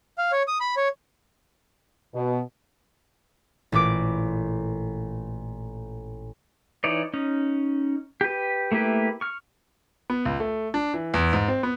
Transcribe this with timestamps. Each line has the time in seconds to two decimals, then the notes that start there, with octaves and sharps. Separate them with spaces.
0.18 F5
0.32 C#5
0.48 D#6
0.60 B5
0.77 C#5
2.14 B2
3.72 A1 A#2 B4 D6 D7
6.84 E3 D#4 C#5 D5
7.14 C#4 D#4
8.21 G4 B4
8.72 A3 A#3 E4 G4 B4
9.21 C#6 F6
10.10 B3
10.25 C#2
10.40 A3
10.74 D4
10.94 E3
11.14 E2
11.33 G#2
11.48 C4
11.63 B3